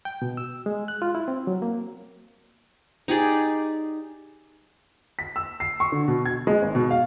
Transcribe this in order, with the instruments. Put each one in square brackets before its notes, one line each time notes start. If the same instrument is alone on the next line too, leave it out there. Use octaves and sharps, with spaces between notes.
[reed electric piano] G5
B2
E6
G#3
F#6
F4
E4
C4
F#3
A#3
[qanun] D#4 G4 G#4 D5
[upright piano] B6
E6
C7
C#6
D3
B2
G#6
G#3
G#1
B2
F5